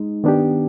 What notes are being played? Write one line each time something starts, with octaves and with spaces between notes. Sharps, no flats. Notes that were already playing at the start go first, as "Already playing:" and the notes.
Already playing: G#3 D#4
D#3 B3 D4 G4